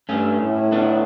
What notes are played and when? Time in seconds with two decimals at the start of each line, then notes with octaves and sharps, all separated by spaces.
0.09 G2 A3 C#4
0.41 A2
0.72 B3 D4